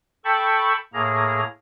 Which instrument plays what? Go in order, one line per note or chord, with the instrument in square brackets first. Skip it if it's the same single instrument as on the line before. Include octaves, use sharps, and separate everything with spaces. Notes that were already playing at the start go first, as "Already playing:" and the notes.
[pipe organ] A4 G5 A5 B5 C#6
A2 A#3 G#4 A#5